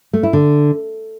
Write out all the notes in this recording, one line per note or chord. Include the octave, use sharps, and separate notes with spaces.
A3
E4
D3